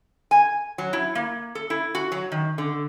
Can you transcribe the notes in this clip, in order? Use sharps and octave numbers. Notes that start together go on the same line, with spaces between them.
G#5
F#3
E4
A#3
A4
E4
F#4
F#3
D#3
D3